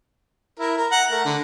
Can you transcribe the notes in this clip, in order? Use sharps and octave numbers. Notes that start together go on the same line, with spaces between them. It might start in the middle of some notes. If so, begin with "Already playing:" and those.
E4 A#4
A#4
F#5 A#5
A3 A#4
D3